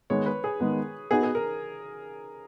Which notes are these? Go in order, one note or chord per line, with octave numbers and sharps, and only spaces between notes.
D#3 G#3 B3 C#5
B4
G#4
D#3 G#3 B3
B3 D#4 F#4 G#4
G#4
A#4